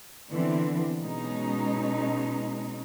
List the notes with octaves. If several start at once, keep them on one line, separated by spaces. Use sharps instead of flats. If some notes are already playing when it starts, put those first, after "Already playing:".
D3 E3 B3 C4 D4
B2 G#3 C#4 D#4